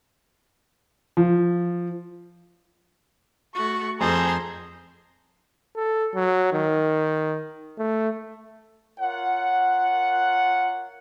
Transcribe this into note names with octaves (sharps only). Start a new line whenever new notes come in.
F3
A3 F#4 C#6
F2 G#4 A4 C5 A#5 C6
A4
F#3
D#3
A3
F4 A#4 C#5 F#5